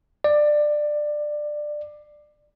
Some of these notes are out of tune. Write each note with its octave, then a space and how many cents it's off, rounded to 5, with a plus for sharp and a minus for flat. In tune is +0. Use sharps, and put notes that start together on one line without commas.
D5 +20